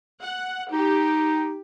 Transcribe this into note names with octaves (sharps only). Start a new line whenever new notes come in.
F#5
D#4 G4